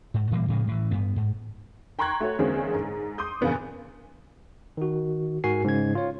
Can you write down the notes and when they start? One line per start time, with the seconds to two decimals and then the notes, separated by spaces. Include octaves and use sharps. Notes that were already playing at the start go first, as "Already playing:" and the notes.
0.14 G#2
0.31 A#2 E3 G3 A#3
0.48 A2 C#3 F3 G#3
0.67 A2 E3
0.91 G2 B3
1.16 G#2
1.99 G5 A#5 C6 C#6 F#6 G#6
2.20 A3 F#4 C#5
2.39 E2 D3 G#3 A#3 C4 C#4
2.73 G#2
3.18 C6 D6 D#6 G6
3.41 E2 A#2 C#3 A#3 B3 D4
4.77 D#3 F#4
5.44 G#2 F#4 A#4 G#5 C7
5.64 G#2 C#3 C#4 G#6
5.95 F4 C#5